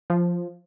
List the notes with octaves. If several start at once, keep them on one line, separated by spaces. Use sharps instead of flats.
F3